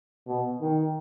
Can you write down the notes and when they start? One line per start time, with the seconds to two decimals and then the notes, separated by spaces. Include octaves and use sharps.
0.27 B2
0.61 D#3